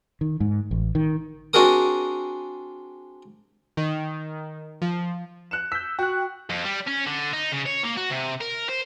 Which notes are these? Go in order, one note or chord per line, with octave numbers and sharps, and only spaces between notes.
D#3
G#2
A1
D#3
C4 D4 F#4 G#4 A#4 D#6
D#3
F3
F#6 C#7 E7
E6 G6 B6
F#4 G5 F#6
F2
G3
C#4
D3
D#4
C#3
C#5
A#3
F#4
C3
A#4
C5